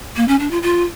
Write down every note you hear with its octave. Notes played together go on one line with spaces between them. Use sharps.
A#3
C#4
D4
F4
F4